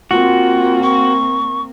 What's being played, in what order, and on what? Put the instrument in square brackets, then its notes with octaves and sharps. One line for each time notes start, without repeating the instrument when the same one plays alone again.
[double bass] A#3 C4 [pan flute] F4 [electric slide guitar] F#4
[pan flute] C#6